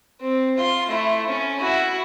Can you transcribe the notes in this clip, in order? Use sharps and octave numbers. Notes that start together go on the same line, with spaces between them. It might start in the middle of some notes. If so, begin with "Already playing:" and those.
C4
F4 C6
A3 E4
C#4
E4 F#4